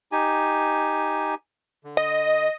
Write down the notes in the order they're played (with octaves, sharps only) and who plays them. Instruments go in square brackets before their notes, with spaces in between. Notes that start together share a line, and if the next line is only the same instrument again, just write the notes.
[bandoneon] D#4 G4 G#5
D3
[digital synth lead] D#5